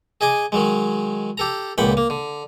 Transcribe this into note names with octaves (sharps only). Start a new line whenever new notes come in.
G#4 D#5 G#5 D6
D#3 F#3 G#3
G4 A4 A#5
C#2 A#2 F#5 G5 B5
A#3
D3